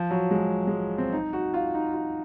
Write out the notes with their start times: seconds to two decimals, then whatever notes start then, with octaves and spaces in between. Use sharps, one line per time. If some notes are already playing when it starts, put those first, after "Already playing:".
Already playing: F3
0.11 F#3
0.31 G#3
0.67 G#3
0.98 C4
1.12 D#4
1.33 F#4
1.54 F4
1.75 D#4
1.94 F4